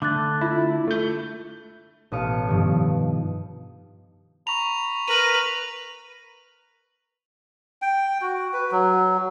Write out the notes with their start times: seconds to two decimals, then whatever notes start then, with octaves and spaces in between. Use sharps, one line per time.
0.02 D3 A3 D6 F#6 A6
0.41 E4 F4
0.88 A3 G6
2.12 A1 B2 F5 D#6 C#7 D7
2.48 G2 B2 D#3 F3
4.47 A#5 B5 C#6 F7
5.08 A#4 B4 D#7 F#7
7.82 G5
8.21 F#4
8.53 B4
8.72 F#3